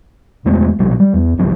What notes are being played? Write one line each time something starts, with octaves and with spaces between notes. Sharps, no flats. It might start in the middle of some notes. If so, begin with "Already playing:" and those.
E2 G#3 A3 C4
A#1 B2 G3
G3
E2
F#1 C2 F3 C4